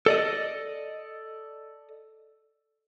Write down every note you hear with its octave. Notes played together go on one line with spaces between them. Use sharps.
A4 D5 D#5